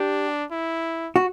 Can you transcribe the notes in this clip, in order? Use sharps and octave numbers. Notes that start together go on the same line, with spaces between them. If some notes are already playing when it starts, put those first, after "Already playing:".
Already playing: D4 G4
E4
F#4